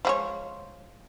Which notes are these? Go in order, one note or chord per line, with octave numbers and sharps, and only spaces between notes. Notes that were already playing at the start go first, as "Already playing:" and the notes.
F3 G#3 C#5